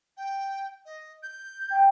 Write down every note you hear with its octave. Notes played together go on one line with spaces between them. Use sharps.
G5
D#5
G6
G5